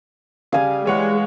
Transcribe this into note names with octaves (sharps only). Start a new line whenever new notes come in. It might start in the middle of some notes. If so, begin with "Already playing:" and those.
C#3 G3 F5 G#5 D#6
E3 G#3 C#5 F#5